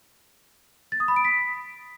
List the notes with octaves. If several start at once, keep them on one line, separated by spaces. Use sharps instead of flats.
A6
D#6
B5
D7
B6